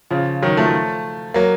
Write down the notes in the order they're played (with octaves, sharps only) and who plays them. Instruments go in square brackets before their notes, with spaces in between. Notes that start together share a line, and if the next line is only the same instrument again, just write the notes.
[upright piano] C#3 F3
D#3 F#3
F3 A3
F#3 A#3